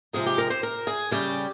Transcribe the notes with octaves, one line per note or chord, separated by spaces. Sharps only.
C3 F3 G#3 D#4 G#4
G4
A#4
C5
A#4
G#4
C#3 G3 C#4 G4